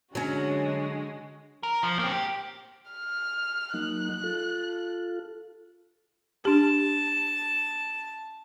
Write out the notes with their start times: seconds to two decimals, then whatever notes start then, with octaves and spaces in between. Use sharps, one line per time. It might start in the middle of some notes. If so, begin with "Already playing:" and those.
0.15 D3 F#3 G#3 C#4 F#4
1.63 A#4
1.84 F3
1.99 A#3 C4
2.12 G4
2.91 F6
3.74 F#3 A#3 D#4 F#6
4.24 F4 A4
6.45 D4 G4 A5